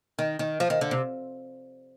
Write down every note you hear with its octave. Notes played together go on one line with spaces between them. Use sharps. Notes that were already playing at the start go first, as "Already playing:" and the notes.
D#3
D#3
F3
D#3
D3
C3